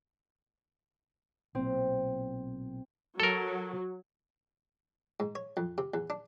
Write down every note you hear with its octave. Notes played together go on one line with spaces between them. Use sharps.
B1 A#2 C4
F#3 A4 A#4
G#2
C#5
F2
C3
E2
D4